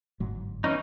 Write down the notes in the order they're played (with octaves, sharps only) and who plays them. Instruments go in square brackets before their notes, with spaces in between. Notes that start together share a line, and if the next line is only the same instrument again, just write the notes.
[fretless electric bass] G1 G#2 F#3
[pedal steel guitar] E3 C#4 D#4